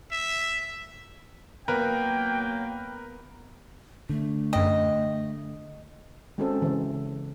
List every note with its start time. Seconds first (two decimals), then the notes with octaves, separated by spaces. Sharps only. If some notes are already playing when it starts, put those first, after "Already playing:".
0.12 E5
1.68 F#3 A#3 B3 A#4 B4 G5
4.09 D3 A3
4.53 F#2 D#5 G5
6.38 G#3 C4 C#4 F#4 A4 C5
6.62 C#3 E3